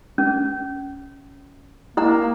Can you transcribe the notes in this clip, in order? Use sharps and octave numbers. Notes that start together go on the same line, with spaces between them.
C#4
A#3 E4 F#5 A#5